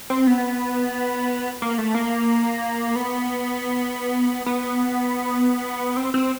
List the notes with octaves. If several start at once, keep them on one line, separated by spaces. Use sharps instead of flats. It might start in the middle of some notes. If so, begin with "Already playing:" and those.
C4
B3
A#3
A3
A#3
B3
B3
C4
C4